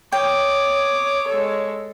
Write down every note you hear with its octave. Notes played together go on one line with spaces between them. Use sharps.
C#5 G5 D6 D#6
G#3 A4